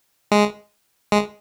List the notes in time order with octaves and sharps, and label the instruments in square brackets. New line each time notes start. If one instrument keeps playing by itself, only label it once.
[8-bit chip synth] G#3
G#3